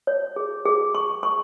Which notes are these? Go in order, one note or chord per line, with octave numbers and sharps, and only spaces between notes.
C#5
G#4
G#4
C#6
C#6